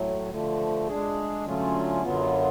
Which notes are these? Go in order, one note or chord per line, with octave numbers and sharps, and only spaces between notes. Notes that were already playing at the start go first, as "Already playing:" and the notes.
Already playing: A2 F#3 A3
D3 F3 A3
G#3 D4 G#4
D3 F#3 A3 C#4 F4
F#2 D3 F#3 B3 F4